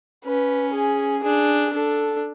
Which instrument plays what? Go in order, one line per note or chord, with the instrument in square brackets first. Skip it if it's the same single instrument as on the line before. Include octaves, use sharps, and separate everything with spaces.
[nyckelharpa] C#4 [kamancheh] B4
[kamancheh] G#4
[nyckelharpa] D4 [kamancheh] G#4
[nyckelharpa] D4 [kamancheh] A4